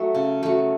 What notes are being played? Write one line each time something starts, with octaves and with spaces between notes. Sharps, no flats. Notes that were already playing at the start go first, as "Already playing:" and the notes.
Already playing: F#3 A3
C#3
F#3 A3